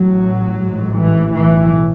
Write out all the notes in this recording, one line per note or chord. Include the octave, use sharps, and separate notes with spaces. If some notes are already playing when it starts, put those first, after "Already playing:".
Already playing: A1 A2 F#3
A1 G#2
E3
B1 A2 E3